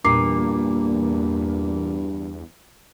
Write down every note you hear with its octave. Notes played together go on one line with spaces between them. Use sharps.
E2 G2 A#2 D6 C7